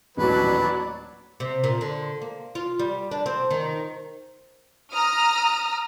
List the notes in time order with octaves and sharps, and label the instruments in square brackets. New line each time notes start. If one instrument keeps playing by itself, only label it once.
[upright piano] D#1 A1 [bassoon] B2 [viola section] F#3 D4 D5 [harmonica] B4
[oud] C3
A#2
D3
A#3
F4
G3
D4
C4
D#3
[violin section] A#5 D#6 F6